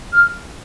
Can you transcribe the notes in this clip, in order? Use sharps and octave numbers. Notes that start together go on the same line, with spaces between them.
F6